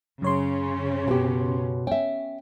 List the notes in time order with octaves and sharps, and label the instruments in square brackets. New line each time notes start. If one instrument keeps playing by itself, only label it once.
[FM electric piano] F#2 C#5 C6 [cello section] C#3 C#4
[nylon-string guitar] B2 G4
[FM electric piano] C#4 [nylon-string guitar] E5 G5